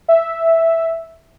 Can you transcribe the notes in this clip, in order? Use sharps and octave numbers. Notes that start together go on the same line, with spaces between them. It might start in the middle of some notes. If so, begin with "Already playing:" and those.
E5